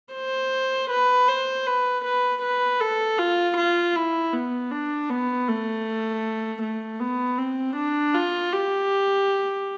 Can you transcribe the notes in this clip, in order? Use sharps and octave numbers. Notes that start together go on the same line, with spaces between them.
C5
B4
C5
B4
B4
B4
A4
F4
F4
E4
B3
D4
B3
A3
A3
B3
C4
D4
F4
G4